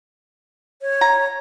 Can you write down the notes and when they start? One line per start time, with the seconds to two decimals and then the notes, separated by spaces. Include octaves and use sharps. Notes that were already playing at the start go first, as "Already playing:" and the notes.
0.82 C#5
1.01 A#5